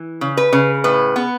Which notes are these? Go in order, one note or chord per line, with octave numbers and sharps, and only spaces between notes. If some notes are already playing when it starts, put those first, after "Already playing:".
Already playing: E3
C#3
B4
C#3
A2 B4
B3